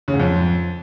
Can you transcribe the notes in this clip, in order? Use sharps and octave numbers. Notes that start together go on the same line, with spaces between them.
C#3
G#2
F2